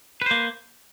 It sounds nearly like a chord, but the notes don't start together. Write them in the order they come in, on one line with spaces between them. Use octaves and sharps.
B4 C5 A#3